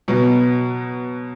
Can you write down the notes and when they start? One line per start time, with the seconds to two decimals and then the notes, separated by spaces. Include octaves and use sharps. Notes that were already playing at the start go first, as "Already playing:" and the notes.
0.08 B2 F#3 B3